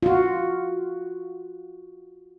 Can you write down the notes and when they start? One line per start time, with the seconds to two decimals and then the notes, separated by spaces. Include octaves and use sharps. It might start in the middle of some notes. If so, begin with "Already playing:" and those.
0.03 F4 F#4